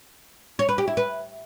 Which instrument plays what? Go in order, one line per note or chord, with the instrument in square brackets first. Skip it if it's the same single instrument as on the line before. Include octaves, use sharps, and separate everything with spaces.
[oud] C#5
B4
G4
E4
B4